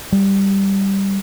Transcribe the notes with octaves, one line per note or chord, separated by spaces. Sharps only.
G3